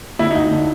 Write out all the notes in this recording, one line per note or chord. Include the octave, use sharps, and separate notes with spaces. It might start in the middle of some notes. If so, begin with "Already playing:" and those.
D3 E4
D#4
D2
D3